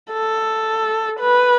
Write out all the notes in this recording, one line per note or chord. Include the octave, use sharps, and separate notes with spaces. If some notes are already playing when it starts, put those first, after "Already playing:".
A4
B4